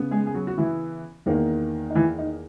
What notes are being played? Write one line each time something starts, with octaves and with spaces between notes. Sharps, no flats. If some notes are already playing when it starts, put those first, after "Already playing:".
Already playing: C#3 B3
G#3 G#4
G#4
F#3 F#4
F#4
E3 E4
E2 D#3 A#3
D#4
E3 E4
D#4